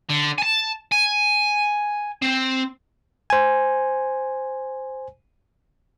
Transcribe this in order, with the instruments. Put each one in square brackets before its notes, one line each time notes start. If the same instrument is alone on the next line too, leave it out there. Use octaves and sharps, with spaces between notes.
[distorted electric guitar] D3
G#5 A5
G#5
C4
[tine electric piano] C5 G#5